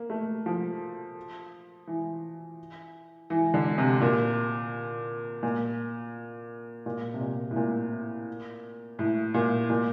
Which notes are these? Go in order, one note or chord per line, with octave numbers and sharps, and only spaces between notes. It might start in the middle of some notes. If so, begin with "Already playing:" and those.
Already playing: A#3
A3
F3
E3
E3
D3
C3
A#2
A#2
A#2
C3
A#2
A2
A#2
A2
A#2
A#2